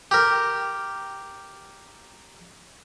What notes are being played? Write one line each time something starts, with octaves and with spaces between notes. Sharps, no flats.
G4 A#4